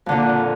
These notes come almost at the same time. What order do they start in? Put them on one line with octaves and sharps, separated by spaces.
F2 D3 A#2